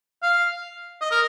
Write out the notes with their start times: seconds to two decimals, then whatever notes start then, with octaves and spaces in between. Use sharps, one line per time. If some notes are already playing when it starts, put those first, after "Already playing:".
0.23 F5
1.01 D#5
1.11 A#4